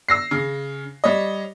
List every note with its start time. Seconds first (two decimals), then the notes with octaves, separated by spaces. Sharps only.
0.09 E6 A#6 C7
0.31 C#3
1.04 G3 C#5 D#5